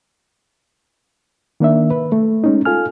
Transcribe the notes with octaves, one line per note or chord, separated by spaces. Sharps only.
D#3 A#3 D4 E5
B4
A3
G#3 C#4 D#4
F4 A4 G#5 F6